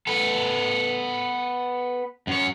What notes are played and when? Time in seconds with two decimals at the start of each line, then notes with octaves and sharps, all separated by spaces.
0.07 B3 A4
2.27 F#2 C#5